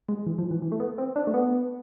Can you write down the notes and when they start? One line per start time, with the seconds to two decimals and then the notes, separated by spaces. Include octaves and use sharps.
0.09 G#3
0.26 E3
0.38 F3
0.51 E3
0.62 E3
0.72 A3
0.80 B3
0.98 C4
1.16 D4
1.27 A3
1.34 B3